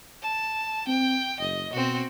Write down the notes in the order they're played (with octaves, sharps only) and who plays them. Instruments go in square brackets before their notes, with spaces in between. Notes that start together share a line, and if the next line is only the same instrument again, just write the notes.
[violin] A5
[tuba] C4 [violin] G5
[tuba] F#1 [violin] D#5
[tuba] B2 [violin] C4 F#4